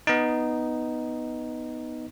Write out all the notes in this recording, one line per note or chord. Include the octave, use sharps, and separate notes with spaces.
B3 D#4